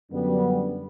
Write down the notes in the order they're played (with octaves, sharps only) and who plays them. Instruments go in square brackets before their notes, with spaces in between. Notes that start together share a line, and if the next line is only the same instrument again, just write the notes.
[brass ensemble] F#2 D3 G3 B3